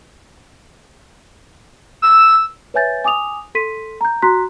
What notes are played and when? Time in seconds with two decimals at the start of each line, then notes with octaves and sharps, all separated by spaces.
2.02 E6
2.74 B4 C#5 E5 G#5 G6 A6
3.04 G#5 D6 D#6 F7
3.55 A4 C6 B6 D#7
4.01 A#5 G6
4.22 F#4 A#5 C6 F#6 B6